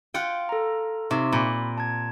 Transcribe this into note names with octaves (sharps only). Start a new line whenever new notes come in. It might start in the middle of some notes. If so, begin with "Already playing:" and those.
F4 F#5 G5
A4 A#5
C3 D#4 E5 C#6
A#2 B5
A5 G#6